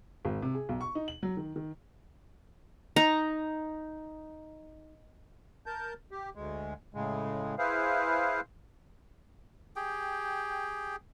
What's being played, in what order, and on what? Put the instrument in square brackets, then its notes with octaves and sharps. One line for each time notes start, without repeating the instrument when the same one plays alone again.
[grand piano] G#1
C3
G#4
B1
C#6
D#4
F#7
F#3
D#3
D#3
[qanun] D#4 A#5
[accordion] A#4 A5 G6
G4
D2 G#3
A2 C#3 G#3
E4 G#4 B4 C5 F5
[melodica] G4 G#4 G5